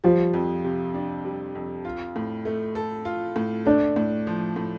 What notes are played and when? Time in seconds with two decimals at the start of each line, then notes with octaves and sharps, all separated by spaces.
0.04 F3 G3
0.34 F2
0.64 C3
0.94 D4
1.25 G3
1.55 F2
1.85 F4
2.16 A2
2.45 A3
2.75 A4
3.05 F4
3.36 A2
3.65 A3 D4
3.96 A2
4.27 F3
4.56 A2